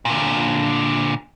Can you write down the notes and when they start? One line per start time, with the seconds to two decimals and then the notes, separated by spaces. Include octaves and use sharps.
0.05 A#2 D3